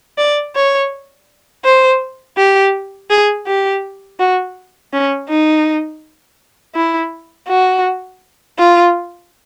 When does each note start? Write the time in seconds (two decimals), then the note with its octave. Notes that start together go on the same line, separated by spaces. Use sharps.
0.18 D5
0.55 C#5
1.65 C5
2.37 G4
3.10 G#4
3.47 G4
4.19 F#4
4.93 C#4
5.29 D#4
6.75 E4
7.48 F#4
8.59 F4